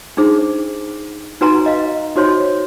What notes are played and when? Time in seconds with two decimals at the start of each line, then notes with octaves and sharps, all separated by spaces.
0.17 D4 D#4 G#4 C5
1.41 D#4 F#4 B4 G#5 A#5 C6
1.66 D#5 F5
2.16 D#4 F#4 C5 C#5 C6